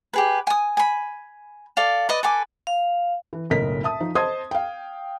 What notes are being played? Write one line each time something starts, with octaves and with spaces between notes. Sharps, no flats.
G4 G#4 B4
G#5 D#6
G#5 B5
A4 D5 F5
B4 D5 D#5
A4 B4 G#5 D6
F5
E3
F#1 B1 A2 A#4 D#5 B6
E5 A5 D#6
F3 D#4
C5 D#5 A5 C6 D#6 G#6
F5 G5